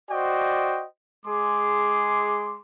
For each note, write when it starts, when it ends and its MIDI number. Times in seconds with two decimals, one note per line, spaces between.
0.11 0.85 66
0.11 0.85 72
0.11 0.85 74
0.11 0.85 75
0.11 0.85 79
1.26 2.61 56
1.26 2.61 68
1.26 2.61 84
1.26 2.61 86